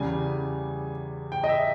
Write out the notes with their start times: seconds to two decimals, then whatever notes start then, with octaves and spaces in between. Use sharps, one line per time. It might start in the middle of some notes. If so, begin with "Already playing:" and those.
Already playing: E2 C#3 G3 G#5
1.32 G5
1.44 D#5
1.49 E5